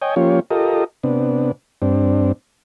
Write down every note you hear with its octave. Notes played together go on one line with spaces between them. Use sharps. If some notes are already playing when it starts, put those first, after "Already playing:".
C#5 D#5 G5 G#5
F3 A#3 C#4 F4 G4 C#5
F4 G4 A4 A#4 D#5
C3 B3 D4
G2 C4 D4